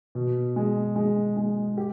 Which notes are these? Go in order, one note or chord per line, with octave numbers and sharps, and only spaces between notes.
B2
G#3
G#3
G#3
G4